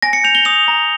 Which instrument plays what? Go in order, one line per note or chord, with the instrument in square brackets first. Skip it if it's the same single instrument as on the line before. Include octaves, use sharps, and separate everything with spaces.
[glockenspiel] G#5 A#6
C#7
G6 F7
G7
D#6 F7
A#5